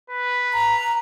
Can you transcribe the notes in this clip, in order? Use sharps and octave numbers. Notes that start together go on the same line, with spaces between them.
B4
A#5